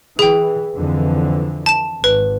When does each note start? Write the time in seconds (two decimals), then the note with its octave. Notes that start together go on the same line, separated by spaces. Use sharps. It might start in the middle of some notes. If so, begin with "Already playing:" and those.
0.19 E3 G#4 G5
0.75 F2 D3 E3
1.66 A5 E7
2.04 G#1 B4